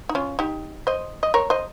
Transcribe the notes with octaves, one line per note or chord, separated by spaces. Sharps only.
D#4
C#4 F4
D#4 G4
C5 D#5
D#5
A#4 C#5
C5 D#5